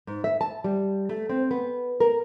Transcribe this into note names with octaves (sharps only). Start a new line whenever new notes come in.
G#2
E5
A5
G3
A3
C4
B3
A#4